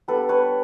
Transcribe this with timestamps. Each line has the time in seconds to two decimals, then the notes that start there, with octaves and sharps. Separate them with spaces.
0.08 G3 B3 D4 A4 B4
0.29 B4 C#5